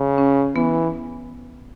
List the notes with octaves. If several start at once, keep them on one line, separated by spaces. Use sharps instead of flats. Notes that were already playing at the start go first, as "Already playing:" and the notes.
Already playing: C#3
C#4
E3 B3